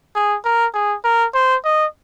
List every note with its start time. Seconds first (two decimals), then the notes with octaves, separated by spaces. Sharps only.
0.15 G#4
0.45 A#4
0.74 G#4
1.04 A#4
1.34 C5
1.64 D#5